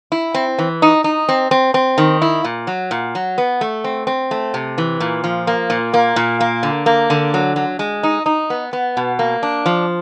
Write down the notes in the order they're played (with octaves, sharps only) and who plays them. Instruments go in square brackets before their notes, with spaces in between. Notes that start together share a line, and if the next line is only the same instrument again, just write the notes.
[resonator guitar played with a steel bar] E4
C4
E3
D#4
D#4
C4
C4
C4
D#3
E4
A#2
F#3
A#2
F#3
B3
A3
C4
C4
A3
C3
E3
A#2
F3
A#3
A#2
A#3
A#2
A#3
D3
A#3
D3
F#3
F#3
G#3
D#4
D#4
B3
B3
B2
A#3
D4
F3